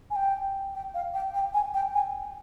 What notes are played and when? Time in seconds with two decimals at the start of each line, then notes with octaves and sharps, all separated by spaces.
0.10 G#5
0.16 G5
0.75 G5
0.94 F5
1.14 G5
1.34 G5
1.54 G#5
1.74 G5
1.94 G#5